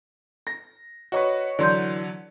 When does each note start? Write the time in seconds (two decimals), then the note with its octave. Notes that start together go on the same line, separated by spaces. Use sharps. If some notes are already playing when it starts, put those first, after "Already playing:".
0.47 A#6
1.12 F#4 B4 C#5 D#5 C#6
1.59 D3 E3 F#3 D5 C6 G6